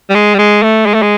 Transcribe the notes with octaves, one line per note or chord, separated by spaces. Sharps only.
G3
G#3
G3
G#3
A3
G#3
A3
G#3